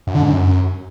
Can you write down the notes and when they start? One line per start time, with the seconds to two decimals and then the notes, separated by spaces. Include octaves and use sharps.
0.07 F#2
0.15 D3
0.22 G#2
0.30 F#2